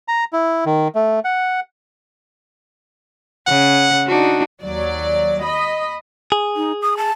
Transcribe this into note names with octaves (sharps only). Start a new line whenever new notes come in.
A#5
E4
D#3
A3
F#5
C#3 F#5
D4 D#4 F#4
D#2 F#3 D5
D#5 B5
G#4
D#4
D#6
A5